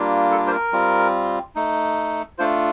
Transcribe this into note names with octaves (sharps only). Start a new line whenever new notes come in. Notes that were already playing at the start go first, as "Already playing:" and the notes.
Already playing: G3 A#3 D4 F4
A4
C5
A#4
G3 C4 F4
A3 D#4
A3 D4 F4 C5